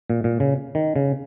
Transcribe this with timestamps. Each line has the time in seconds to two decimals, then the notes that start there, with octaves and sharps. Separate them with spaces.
0.10 A#2
0.24 A#2
0.40 C#3
0.75 D#3
0.96 C#3